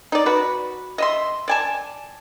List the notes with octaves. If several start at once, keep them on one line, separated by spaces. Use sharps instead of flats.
D#4 D5
F#4 B4
D#5 E5 C6
D5 G#5 A5